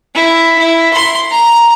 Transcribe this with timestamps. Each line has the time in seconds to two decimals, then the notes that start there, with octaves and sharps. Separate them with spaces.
0.15 E4
0.58 E4
0.94 C6
1.31 A#5